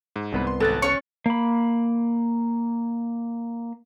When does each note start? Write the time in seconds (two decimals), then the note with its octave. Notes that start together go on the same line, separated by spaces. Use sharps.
0.16 G#2
0.33 C2 B3 B4
0.47 C6
0.60 G#1 A4 F#6 A6
0.82 C#4 C#5 C#6
1.26 A#3 B5